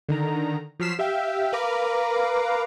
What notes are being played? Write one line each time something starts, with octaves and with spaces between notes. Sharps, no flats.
D3 D#3 A#5
F3 F#3 F6 B6 C7 E7
G4 E5 F5 G5
A#4 B4 F5 A#5 D6